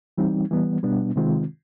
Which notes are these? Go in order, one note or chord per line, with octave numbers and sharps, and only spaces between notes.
E3 G3 C4 D#4
E3 G3 B3
B2 G3 B3 D4
C3 D#3 G#3 C4 F4